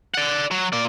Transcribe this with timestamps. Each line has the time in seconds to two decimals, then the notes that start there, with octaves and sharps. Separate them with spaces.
0.14 D5 F#5
0.51 F#3
0.73 A#2 D5